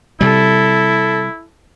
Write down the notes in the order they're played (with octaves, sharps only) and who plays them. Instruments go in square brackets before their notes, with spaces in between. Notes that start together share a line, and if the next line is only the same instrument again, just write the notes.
[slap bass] C3 G3 [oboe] E4 [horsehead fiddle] A4